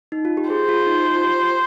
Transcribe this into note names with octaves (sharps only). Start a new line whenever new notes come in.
D#4
F4
G4
G#4 C5
F4
F4
D#4
F4
F4
G4